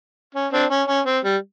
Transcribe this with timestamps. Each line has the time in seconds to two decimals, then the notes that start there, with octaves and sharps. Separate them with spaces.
0.35 C#4
0.53 C4 D4
0.70 C#4
0.88 C#4
1.06 C4
1.24 G3